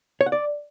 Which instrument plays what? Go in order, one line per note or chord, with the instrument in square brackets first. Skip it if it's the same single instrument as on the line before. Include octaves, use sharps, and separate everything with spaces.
[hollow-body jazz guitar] C#5
F#5
D5